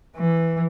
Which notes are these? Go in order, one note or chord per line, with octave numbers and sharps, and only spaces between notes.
E3